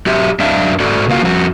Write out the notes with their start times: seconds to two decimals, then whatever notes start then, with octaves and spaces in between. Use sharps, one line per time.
0.06 F#3 G4 E5
0.39 F#2 D4 E5 F5
0.80 G#2 F#4 A4 D5
1.08 C#3 A#3 F4 F#4 F5 F#5
1.22 F2 F#4